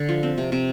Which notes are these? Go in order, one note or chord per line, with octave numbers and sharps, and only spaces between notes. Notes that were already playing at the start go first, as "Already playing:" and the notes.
Already playing: D3
F3
C4
C3
C3